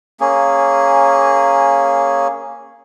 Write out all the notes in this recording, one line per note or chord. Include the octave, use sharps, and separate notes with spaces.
A#3 C#4 G#4